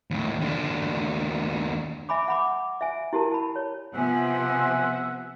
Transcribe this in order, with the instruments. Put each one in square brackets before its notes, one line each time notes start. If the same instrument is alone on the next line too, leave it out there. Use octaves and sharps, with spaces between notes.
[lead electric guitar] D#2 A2
D#2 D4
[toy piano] E5 G#5 B5 D6
F#5 B5 D6
E5 G#5
E4 G4 A#4 A5
A5 B5
C#5
[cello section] C3 F3 B3 [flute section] C5 G#5 [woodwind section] E5 F#5